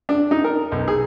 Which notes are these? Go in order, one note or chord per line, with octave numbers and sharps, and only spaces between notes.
D4
D#4
A#4
B1
G#4